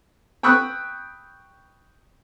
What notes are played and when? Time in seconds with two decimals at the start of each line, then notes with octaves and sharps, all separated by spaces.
0.43 G5 B5 C#6 D#6 E6 F#6